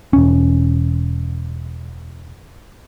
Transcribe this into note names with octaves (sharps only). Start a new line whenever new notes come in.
E1 C#4